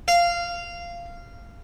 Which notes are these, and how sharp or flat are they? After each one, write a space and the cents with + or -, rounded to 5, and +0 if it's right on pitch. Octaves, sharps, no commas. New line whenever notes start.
F5 -15